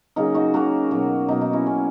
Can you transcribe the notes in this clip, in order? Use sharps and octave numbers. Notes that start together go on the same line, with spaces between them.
C#3 F#3 A#3 D#4
D#4 F#4
C#3 F#3 A#3 F#4 A#4
B2 F#3 A#3
B2 F#3 A#3 D#4
D#4
C#4 E4
B2 A#3 C#4